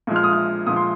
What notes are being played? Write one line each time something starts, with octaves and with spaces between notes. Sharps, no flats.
A#2 F3 G#3
F6
D#6
F6
A#2 F3 G#3 D#6
C6